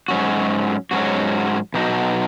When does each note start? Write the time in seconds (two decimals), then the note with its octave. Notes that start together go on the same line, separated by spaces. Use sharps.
0.08 G#2 F#3 C#4 F#4
0.91 G#2 F#3 C#4 F#4
1.74 B2 F#3 D#4 F#4